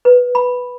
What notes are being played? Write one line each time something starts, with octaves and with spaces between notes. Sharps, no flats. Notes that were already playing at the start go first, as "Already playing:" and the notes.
B4
B5